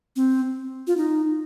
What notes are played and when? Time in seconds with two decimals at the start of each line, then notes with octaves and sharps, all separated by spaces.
0.16 C4
0.87 F4
0.97 D#4